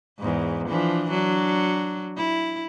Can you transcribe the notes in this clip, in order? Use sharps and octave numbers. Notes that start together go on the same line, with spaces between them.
E2 G#2
E3 F3 D4
F#3 D4
E4